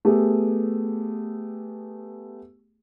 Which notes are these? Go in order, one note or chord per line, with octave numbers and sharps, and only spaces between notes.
A3 B3 G4 G#4